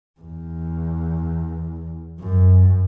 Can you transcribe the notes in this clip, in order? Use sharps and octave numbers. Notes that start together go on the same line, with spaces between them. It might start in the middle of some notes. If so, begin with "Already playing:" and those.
E2
F#2